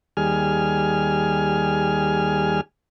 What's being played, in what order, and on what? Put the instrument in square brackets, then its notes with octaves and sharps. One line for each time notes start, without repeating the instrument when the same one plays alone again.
[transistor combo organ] D#2 G3 G#4 G#5 F6